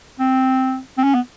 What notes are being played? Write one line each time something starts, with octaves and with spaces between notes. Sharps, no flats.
C4
C4
C#4
B3